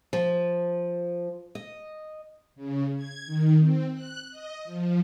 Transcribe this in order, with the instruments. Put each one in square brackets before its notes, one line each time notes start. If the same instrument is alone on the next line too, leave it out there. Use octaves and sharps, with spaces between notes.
[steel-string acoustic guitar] F3
D#5
[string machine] C#3
G#6
D#3
C4
F#6
D#5
F3